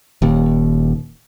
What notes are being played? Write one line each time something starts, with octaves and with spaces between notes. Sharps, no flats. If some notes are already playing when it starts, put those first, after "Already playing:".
D#1 D#2